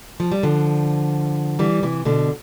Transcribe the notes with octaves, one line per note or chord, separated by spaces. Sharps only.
F3
G3
D3 F3
E3 G3
C3 E3
B2 D3